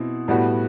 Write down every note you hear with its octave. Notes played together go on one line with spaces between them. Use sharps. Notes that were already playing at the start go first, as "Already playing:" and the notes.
Already playing: B2 C4 E4
A2 G3 B3 F#4